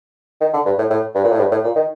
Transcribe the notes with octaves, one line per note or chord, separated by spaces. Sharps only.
D#3
D3
G2
A2
A2
G2
A#2
A2
G2
A2
A#2
D#3